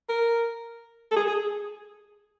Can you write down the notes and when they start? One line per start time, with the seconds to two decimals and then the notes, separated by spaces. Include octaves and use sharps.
0.09 A#4
1.11 A4
1.16 G#4
1.28 G#4